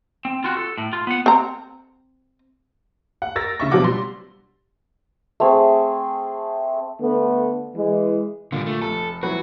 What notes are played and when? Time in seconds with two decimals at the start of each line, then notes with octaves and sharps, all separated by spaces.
0.25 C4
0.44 F4 F#4
0.57 A4
0.78 A2
0.93 F4
1.07 B3 F#5
1.26 C4 A#5
3.22 F#5
3.36 A#4 E6 A6 A#6
3.60 C#3 E5 C#6
3.71 B2 F3 F#3 D4 F#5 D6
3.84 G3 C6
5.40 A3 C4 G#4
7.01 D3 A3 B3
7.75 E3 G#3
8.52 A#2 D3 G3
8.66 A3
8.81 F1 A4
9.23 E3 F#3 F#4 B4